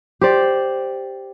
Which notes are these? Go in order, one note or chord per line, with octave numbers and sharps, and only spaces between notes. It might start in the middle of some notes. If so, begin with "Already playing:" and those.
G4 C5 D5